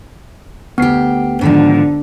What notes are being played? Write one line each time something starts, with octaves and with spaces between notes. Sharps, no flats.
D2 B3 G4 C7
G#2 D3 D#3 F3